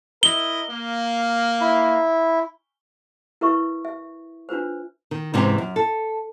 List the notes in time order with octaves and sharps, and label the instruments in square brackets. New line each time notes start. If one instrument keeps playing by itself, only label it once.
[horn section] E4 A#4 D#5 [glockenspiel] G7
[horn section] A#3
[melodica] E4
[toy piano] E4 A#4 B4 E5 C#6
E5
D4 F4 B4 C5
[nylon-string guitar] D#3
G#2 C3 E3 C4 C#4 G4
F#2
A4